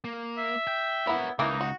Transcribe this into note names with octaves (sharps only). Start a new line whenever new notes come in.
A#3
E5
G5
B3 E4 A#4 C#5
C#2 E3 A#3 D#4 A#4
F#4